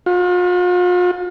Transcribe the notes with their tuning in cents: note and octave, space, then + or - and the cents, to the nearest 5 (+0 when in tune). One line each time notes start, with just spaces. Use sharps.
F4 +45